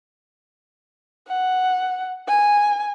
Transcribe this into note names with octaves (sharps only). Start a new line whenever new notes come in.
F#5
G#5